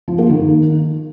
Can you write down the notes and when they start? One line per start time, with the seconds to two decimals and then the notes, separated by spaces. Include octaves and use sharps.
0.08 F3
0.19 A#3
0.29 D#3